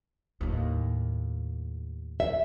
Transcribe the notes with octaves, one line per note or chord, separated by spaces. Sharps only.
D#2 A2
E5